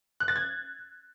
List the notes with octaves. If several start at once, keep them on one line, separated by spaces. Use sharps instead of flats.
F#6
A6
G#6